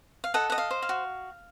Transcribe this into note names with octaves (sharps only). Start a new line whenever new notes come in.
F5
A4 D#5 F#5
D#5 F#5
F5
C5
F5
F#4